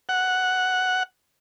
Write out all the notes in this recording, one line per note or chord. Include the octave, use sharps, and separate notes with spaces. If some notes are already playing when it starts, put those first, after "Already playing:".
F#5